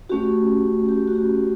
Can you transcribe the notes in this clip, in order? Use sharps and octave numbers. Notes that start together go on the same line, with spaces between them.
A3 C#4 F#4 G4
G4
F#4
G4